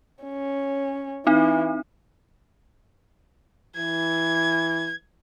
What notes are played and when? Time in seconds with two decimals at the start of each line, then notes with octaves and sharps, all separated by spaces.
0.24 C#4
1.27 E3 C4 D#4
3.77 E3 G#6